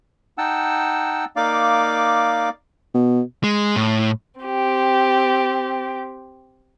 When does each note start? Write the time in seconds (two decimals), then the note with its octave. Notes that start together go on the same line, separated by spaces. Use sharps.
0.38 D#4 F#5 G5 A5 E6
1.36 A#3 D#4 D5 F5 D6
2.94 B2
3.44 G#3
3.76 A2
4.41 C4 G4